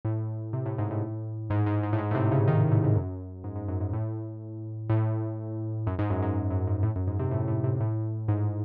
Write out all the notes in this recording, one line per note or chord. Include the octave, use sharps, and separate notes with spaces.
A2
C3
A2
G#2
A2
G#2
G#2
G#2
A2
G#2
A2
C3
C#3
D#3
A2
G#2
F#2
G#2
G#2
F#2
G#2
A2
A2
F#2
G#2
F#2
G#2
G#2
F#2
G#2
A2
F#2
G#2
C3
A2
A2
C3
A2
G#2